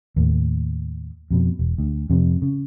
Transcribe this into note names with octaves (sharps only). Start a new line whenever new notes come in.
D#2 A2
F2 B2
E1
D2
F2 C3
C#3